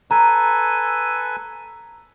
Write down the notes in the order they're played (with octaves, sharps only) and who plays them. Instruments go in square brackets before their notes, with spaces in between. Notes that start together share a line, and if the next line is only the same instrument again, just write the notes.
[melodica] A4 B4 G#5 [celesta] A#5